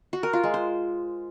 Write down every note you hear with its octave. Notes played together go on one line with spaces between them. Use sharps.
F#4
A#4
F4
G#3
C5